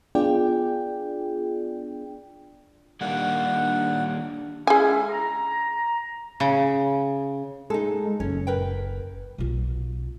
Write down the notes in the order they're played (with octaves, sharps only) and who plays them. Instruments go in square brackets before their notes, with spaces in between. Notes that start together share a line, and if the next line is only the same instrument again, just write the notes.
[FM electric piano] B3 D4 F4 G#4 D5 G5
[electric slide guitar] D#3 G3 A#3 [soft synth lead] D4 [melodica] F#5
[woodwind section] G#3 C#4 E4 [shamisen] G#4 G#5
[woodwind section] A#5
[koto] C#3
[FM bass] G#3 [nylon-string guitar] D#4 A4
[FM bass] F#1 [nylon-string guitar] C#4
[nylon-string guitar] A#4 B4 G5
[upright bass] B1 F4